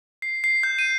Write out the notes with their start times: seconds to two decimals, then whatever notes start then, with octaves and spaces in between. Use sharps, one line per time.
0.22 C7
0.44 C7
0.63 G6
0.79 D#7